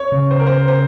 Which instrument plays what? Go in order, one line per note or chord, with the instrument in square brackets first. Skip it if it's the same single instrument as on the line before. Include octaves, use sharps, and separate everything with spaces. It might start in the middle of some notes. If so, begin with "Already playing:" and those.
Already playing: [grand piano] C#5
[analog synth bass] C#3
[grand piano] C5
A#4
C5
C5